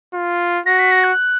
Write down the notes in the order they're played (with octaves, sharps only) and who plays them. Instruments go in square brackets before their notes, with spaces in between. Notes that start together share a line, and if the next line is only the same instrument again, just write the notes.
[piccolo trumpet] F4
[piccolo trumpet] F#4 [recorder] A#6
[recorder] B6
A#6
F#6